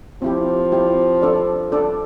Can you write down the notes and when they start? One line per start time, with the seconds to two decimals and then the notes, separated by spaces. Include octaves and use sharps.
0.22 F3 C4 E4 G4
0.72 C4 E4 G4
1.22 D4 A4 D5
1.72 D4 A4 D5